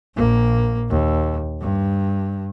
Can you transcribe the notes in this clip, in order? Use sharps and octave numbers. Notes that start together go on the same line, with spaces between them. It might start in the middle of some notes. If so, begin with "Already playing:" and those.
A#1 A#3
D#2
G2